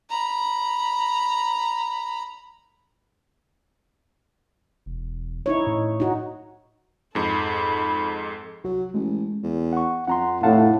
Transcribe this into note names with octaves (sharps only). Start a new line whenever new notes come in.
A#5 B5
E1
D#4 E4 C#5
A2
D#4 F#4
F2 G#2 A4 B5
C2 F#3 F#4
A1 G#3
E2
F#5 C#6
F2 F#5 A#5 C6
F1 A2 F5 F#5 A5